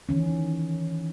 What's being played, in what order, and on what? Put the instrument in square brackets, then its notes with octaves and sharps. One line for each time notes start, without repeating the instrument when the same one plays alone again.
[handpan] D#3 E3 C#4